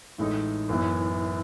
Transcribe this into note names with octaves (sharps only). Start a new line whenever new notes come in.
A1 A2 G#3 D#4
F#1 F#2 E3 B3 E4